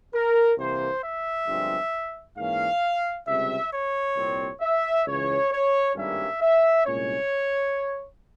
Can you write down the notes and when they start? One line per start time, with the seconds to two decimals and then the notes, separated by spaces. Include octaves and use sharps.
0.13 A#4
0.57 C2 C3 E3 A#3 C5
1.02 E5
1.47 G1 G2 F3 G#3 C4
2.36 G#2 E3 A#3 C#4 F5
3.27 C#2 C3 G3 C4 E5
3.71 C#5
4.16 C2 A#2 G3 C4
4.61 E5
5.06 C#2 C#3 E3 C#5
5.50 C#5
5.95 G#1 G2 G3 A#3 C#4 E5
6.41 E5
6.85 C2 A#2 G#3 C#4 C#5